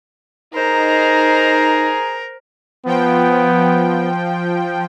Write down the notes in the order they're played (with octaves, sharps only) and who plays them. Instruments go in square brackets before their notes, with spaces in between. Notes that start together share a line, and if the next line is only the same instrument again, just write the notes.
[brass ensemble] D#4 [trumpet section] G#4 A#5 [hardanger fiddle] A#4 [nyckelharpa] C5
[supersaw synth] F3 G5 [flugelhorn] B3